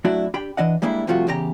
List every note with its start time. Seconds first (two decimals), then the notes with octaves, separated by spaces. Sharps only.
0.04 F#3 A3 D4 E4 F#4 D5
0.34 D4 G4 G5 B5
0.57 E3 D4 D#5 F#5
0.82 G3 G#3 A#3 D4 E4
1.07 G2 C3 F3 A3 F4 F#4
1.27 E2 C#3 G4 B4 A#5